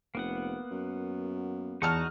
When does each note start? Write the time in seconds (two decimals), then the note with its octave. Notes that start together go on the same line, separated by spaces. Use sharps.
0.15 F1 A#3 B3 F#5
0.71 F#2
1.82 E2 D#4 F#4 A5 C#6 F6